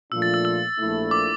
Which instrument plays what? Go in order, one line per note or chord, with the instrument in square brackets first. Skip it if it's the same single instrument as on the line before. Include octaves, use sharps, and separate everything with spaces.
[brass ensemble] A#2 F3 A3 D4 F4 [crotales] E6
[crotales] A6
E6
E6
[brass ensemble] A#1 A#2 A3 E4
[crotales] D6